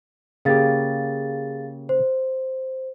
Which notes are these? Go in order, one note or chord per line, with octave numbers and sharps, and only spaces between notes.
C#3 A#3 G4 G#4 F5 A6
C5